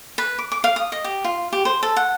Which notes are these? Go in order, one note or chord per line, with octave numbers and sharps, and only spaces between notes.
B4
D6
D6
F5
D#6
D#5
G4
F4
G4
C5
A4
F#5